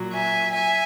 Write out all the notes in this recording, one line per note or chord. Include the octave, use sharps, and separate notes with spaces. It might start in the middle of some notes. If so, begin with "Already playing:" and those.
Already playing: A#2 F#3
E5 G#5
E5 G#5